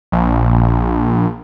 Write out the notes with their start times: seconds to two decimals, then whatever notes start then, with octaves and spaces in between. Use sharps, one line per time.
0.12 A#1